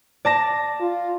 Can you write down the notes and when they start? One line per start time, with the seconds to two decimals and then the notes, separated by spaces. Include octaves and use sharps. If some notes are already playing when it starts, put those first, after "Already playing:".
0.25 D5 A5 A#6
0.81 F4